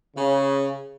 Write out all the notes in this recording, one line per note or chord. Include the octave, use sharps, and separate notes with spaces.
C#3